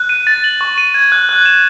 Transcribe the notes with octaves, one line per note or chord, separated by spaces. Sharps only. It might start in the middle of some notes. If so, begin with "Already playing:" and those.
Already playing: F#6
D#7
A6
F#7
C#6
D#7
G#6
F#6
F#6
E7